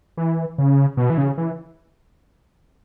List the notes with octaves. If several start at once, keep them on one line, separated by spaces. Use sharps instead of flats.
E3
C#3
B2
E3
C#3
E3